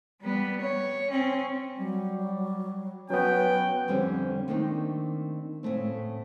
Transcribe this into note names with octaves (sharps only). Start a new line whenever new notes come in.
G3 B3
C#5
C4 C#4
F#3 G3
F#3 B3 C#4 B4 G5
F2 D3 G3 C4 C#4
D#3 A3 A#3 C4 D4 D#4
A2 C#3 A3 C4